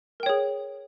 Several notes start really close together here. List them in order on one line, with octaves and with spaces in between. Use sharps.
A#4 G5 C#5 G#4